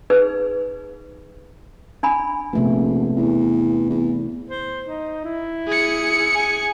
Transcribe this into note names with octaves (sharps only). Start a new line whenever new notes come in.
D#4 G#4 B4
D4 G#5 B5
A#1 C3 A3 B3
E2
E2
C5
D#4
E4
G#4 C#7
G#5